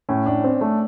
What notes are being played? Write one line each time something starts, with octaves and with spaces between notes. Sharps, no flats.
A2 C#4
A2 D4
C4
A3